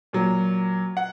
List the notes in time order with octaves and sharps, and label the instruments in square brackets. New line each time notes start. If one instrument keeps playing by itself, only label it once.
[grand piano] A#2 F#3
F#5